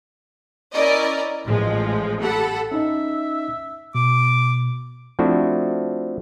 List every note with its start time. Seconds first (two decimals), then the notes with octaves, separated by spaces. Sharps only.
0.73 C#4 E4 A#4 D5 D#5
1.46 A1 A2 F3 G#3
2.21 G4 A4 F#5 B5
2.71 C#4 D#4 D#5 E5
3.95 B2 D6
5.19 F3 A3 C4 D4 E4 F#4